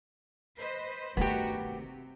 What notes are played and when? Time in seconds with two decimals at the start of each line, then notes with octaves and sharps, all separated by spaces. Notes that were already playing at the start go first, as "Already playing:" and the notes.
0.58 B4 C5 D#5
1.17 G2 D#3 A3 B3 D#4 F#4 G4
1.57 C3